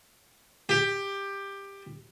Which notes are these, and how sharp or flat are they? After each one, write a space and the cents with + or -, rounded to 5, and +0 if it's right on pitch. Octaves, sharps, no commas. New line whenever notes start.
G4 +15